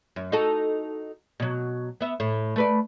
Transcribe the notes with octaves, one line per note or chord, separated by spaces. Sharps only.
F#2
D#4 F#4 A4
B2 F#3
B3 E5
A2
A3 B4 D5